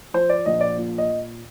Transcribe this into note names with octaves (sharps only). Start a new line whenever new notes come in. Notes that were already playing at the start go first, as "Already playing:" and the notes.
F3 C5
D5
A#1 D#5
D5
A#2
D#5